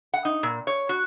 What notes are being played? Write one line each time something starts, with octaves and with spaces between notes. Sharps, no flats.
F#5
D#4
A#2
C#5
F#4